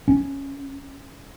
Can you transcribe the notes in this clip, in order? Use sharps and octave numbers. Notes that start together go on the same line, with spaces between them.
C#4